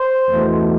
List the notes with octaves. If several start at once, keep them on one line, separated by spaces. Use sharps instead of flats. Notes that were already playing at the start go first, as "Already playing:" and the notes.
Already playing: C5
E2 B2 A3